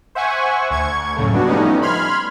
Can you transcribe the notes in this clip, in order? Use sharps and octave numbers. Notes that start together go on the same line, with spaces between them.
C5 E5 F#5 G#5 C#6
D2 C#6 G#6
F#2 A2 C#3 A3
G3 B3 D4 F#4
F3 G3 A3 B3 C#4 D#4
B5 C6 F6 G#6